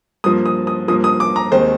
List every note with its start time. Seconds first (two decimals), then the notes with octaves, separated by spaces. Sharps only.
0.24 G2 F3 A#3 D#6
0.46 D#6
0.67 D#6
0.88 G2 F3 A#3 D#6
1.04 D#6
1.20 D6
1.36 A#5
1.52 D#2 D#3 G#3 C4 C5